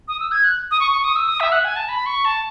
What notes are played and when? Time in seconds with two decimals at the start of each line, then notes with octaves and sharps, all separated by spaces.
0.08 D#6
0.20 E6
0.32 G#6
0.44 F#6
0.71 D#6
0.80 C#6
0.91 C#6
1.04 D#6
1.16 E6
1.28 D#6
1.40 E5
1.52 F#5
1.64 G#5
1.76 A5
1.88 B5
2.06 C#6
2.25 A5